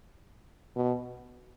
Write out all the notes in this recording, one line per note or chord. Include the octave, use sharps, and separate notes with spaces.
B2